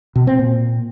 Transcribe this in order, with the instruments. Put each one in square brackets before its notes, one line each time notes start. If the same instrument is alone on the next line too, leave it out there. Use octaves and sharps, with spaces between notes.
[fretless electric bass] B2
C4
A#2